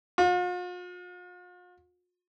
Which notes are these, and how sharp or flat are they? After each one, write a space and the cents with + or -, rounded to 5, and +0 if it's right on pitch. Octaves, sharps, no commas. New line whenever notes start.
F4 +45